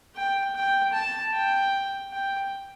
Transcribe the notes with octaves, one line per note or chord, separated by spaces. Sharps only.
G5
G5
A5
G5
G5